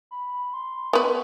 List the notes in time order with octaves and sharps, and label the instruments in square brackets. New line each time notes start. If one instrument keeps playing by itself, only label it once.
[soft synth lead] B5
C6
[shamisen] B3 B4 [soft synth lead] C#6